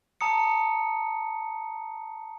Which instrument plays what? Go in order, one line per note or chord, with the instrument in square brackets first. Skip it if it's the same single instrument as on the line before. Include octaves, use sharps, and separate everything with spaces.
[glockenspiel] A5 A#5 D#6 C#7